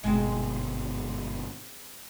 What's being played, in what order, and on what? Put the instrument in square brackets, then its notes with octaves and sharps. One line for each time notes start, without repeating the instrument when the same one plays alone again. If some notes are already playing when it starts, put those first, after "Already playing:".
[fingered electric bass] G1 G#2 B2 [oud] G#3 C4